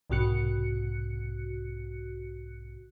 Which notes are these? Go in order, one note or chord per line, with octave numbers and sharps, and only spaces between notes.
B1 G#2 C3 F#4 F#6 C#7